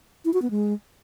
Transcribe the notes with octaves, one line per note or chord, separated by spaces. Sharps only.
E4
F#4
B3
G#3